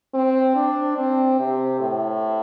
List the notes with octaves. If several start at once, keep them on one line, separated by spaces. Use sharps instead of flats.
C4
D4
C4
C3
A2